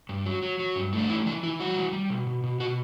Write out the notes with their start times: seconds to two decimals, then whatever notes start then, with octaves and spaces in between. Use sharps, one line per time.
0.09 G2
0.26 F#3
0.43 F#3
0.59 F#3
0.76 G2
0.93 A3
0.98 D4
1.09 E3 E4
1.26 E3 D4
1.43 E3 E4
1.60 G3 F#4
1.77 E3
1.93 G3
2.10 B2
2.27 B2
2.44 B2
2.60 B2 F#4